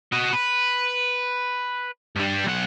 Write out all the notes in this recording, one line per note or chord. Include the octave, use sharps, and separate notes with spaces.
F#4 D#5
B4
G2 G3
B1 F#5